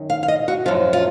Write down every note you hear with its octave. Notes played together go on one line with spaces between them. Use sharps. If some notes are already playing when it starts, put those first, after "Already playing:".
Already playing: F#2 D#3
F5
F5
D#5
F#4
F#2 F3 F4
F4